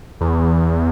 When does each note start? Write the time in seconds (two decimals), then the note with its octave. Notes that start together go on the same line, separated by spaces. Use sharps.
0.21 E2